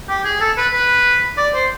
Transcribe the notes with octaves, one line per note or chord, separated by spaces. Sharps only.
G4
G#4
A4
B4
B4
D5
C5